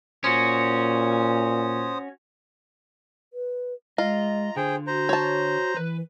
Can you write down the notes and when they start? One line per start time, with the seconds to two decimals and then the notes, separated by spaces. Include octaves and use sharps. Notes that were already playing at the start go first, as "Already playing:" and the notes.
0.24 A#2 C#4 F#4 C5 D#6
3.33 B4
3.98 G#3 F4 D#5 A#5
4.56 D3 G#4 C5 G5
4.87 F#4 C5 A#5
5.09 C#5 A5
5.77 E3 B4